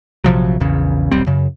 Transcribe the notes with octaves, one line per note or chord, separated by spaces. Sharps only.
A#1 C3 F3 F#3
A#1 E2 C#3
D#1 B1 G3 C4
F#2 C#3